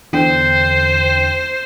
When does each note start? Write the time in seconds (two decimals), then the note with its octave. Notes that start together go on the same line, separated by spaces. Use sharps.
0.13 E2 D3 C5 G5